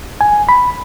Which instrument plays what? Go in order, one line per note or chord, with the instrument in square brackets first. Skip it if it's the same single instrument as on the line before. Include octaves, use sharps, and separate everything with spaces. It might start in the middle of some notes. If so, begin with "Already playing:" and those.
[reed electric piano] G#5
B5